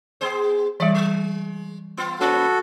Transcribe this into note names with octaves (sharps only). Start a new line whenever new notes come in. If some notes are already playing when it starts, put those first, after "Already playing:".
B3 G#4 C5
E3 G3 D5
G#3
B3 F4
A#3 C#4 F#4 A4 B4